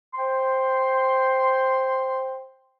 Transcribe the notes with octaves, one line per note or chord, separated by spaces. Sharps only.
C5 G5 C6